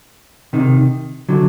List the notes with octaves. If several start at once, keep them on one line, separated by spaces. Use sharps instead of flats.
C3 D#3
D3 F#3